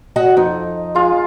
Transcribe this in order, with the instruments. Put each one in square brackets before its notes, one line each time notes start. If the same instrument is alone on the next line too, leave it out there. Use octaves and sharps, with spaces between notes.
[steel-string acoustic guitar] F#4 D#5 F#5
[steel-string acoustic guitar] F2 [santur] D#4
[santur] G#3 F4